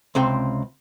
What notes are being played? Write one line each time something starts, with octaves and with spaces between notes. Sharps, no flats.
C#2 C3 C4 C5 G5